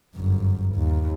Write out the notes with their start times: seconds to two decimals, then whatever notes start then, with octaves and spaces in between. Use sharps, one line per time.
0.16 G1 F#2
0.75 D#2